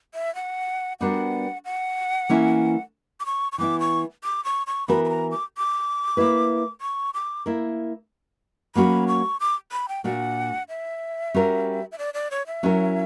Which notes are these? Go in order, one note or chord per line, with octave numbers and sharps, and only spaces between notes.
E5
F#5
G3 B3 D4 F#4 A#4 F#5
F#5
E3 A#3 C#4 E4
D6
C#6
C#6
E3 B3 E4 D6
C#6
D6
C#6
C#6
E3 B3 F#4 A#4 B5
B5
A#5
D6
D6
A#3 E4 B4
C#6
D6
A#3 E4 A#4
F#3 A#3 C#4 F#4 B5
C#6
D6
B5
G5
A#2 A#3 D4 F#4 F#5
E5
G3 C#4 F#4 A#4
E5
D5
D5
C#5
E5
F#3 C#4 E4 A#4